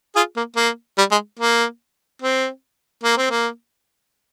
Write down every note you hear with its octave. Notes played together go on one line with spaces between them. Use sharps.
F4 G#4
A#3
A#3
G3
G#3
A#3
C4
A#3
C4
A#3